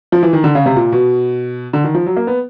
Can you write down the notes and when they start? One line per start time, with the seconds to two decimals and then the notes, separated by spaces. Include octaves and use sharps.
0.12 F3
0.23 E3
0.33 D#3
0.44 D3
0.55 C#3
0.66 C3
0.76 A#2
0.92 B2
1.73 D3
1.84 D#3
1.95 F3
2.06 F#3
2.17 A#3
2.27 B3